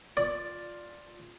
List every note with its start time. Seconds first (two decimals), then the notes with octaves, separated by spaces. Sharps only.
0.17 F4 D5